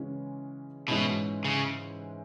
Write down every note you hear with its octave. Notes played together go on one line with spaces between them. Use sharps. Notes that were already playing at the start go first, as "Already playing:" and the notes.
Already playing: C#3 E3 G#3 C#4
G#2 B2 E3 G#3 C#4 E4
C#3